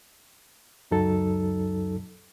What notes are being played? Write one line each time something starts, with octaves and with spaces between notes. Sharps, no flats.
C#2 F#2 F#3 D#4 A4